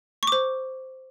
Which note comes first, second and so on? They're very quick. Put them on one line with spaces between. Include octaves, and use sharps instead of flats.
C#6 D6 C5